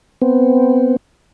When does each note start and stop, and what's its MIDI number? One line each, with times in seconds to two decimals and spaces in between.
0.22 0.96 59
0.22 0.96 60